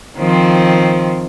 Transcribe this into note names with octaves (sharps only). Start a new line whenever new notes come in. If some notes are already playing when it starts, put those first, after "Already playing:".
D#3 F3 C4